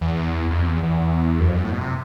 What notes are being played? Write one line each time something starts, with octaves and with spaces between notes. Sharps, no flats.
E2
F2
E2
E2
F#2
F2
F#2
A2
B2
C3